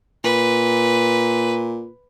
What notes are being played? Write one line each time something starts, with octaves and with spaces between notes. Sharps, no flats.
A#2 B4